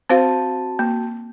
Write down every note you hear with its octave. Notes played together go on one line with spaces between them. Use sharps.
C4 F#4 C5 F5 A5
A#3